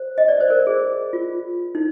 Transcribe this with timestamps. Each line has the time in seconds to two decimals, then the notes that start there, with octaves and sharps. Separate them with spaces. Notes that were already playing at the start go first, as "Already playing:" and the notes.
Already playing: C5
0.18 D#5
0.28 D5
0.40 C5
0.50 A#4
0.67 G#4
1.13 F4
1.75 D#4